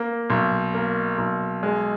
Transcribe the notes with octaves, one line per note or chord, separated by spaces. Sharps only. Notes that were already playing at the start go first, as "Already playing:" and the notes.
Already playing: A#3
B1
A#3
B1
G#3